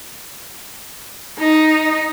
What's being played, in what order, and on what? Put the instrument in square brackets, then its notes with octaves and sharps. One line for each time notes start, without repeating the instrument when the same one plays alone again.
[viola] D#4